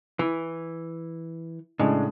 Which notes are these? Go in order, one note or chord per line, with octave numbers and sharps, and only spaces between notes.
E3
A2 C#3 G#3 D4